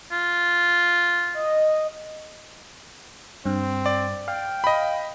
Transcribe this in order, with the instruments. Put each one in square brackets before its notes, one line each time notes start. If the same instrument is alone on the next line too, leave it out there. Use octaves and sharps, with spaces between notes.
[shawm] F4
[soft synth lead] D#5
[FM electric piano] G2 [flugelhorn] C4
[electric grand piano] D5
[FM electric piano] F5 [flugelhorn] G5
[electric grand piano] D#5 B5